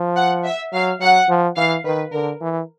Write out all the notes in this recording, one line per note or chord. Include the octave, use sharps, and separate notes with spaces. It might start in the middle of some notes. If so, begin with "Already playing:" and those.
Already playing: F3
F#5
E5
F#3 F5
F#3 F#5
F3
E3 F5
D#3 B4
D3 A#4
E3